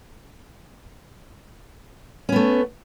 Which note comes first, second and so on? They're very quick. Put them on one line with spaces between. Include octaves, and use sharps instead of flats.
C#4 B3 A3